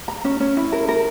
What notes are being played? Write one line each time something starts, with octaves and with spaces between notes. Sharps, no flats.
A#5
C#4
C#4
E4
A#4
A#4